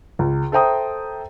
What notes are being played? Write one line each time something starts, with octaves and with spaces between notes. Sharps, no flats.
C#2
A4 C5 E5 G5 A#5 D#6